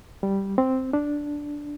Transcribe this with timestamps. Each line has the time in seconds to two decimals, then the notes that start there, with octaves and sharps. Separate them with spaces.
0.23 G3
0.58 C4
0.93 D4